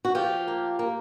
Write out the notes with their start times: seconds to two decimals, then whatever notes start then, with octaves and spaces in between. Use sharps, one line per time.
0.05 F#4
0.15 F3 F4 G4
0.48 A#3
0.79 A#3